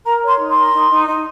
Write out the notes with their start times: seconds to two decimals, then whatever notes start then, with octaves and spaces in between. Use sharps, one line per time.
0.05 A#4 A#5
0.22 C#5
0.27 C6
0.39 D#4
0.51 C6
0.56 A#4
0.73 D#4
0.90 D#4
1.07 D#4